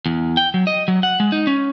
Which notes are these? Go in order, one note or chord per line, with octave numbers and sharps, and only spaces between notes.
E2
G5
F#3
D#5
F#3
F#5
G#3
D#4
C#4